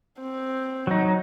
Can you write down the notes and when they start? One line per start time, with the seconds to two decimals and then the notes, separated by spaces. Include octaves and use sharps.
0.20 C4
0.87 F#3 D#4